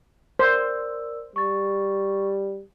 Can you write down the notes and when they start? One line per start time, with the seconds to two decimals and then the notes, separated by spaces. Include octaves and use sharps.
0.39 A#4 C5 D5 E6
1.36 G3 C#6 A6